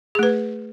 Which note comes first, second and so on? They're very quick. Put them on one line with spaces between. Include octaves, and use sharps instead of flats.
G#4 A3 B4